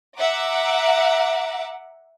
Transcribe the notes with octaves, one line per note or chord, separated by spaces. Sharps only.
E5 F#5 A#5 D6